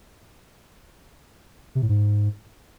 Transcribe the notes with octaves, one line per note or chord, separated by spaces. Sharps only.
C3
A2
G#2